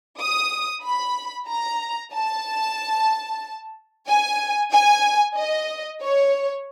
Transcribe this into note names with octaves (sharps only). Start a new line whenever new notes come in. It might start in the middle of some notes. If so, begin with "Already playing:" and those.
D#6
B5
A#5
A5
G#5
G#5
D#5
C#5